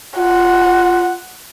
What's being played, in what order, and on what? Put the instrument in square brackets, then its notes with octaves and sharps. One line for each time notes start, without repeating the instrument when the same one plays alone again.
[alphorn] F4 [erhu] F#5